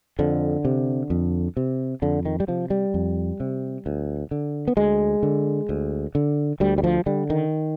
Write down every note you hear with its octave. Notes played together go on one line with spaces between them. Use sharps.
F2 D3
C3
F2
C3
F2 D3
D#3
G3
C3 F3
G3
F2
C3
D2
D3
B3
D2 G#3
D3
D2
D3
D2 G3
G3
F3
D3 G3
D#3